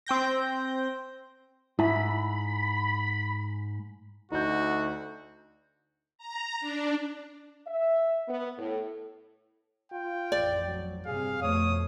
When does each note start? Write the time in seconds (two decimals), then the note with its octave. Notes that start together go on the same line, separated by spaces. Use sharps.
0.06 C4 G5 G6 A#6
1.79 G#2 E4 B5
4.32 D2 D#4 F#4 G6
6.18 A#5
6.60 D4
7.67 E5
8.28 B3
8.58 A2
9.92 F4 G5
10.32 A1 F2 D5
10.66 F#3
11.06 G2 C3 G#4 F5
11.42 F2 B2 A3 C#5 D#6